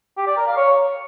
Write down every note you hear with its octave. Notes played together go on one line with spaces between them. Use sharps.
G4
D5
A#4
F5
C#5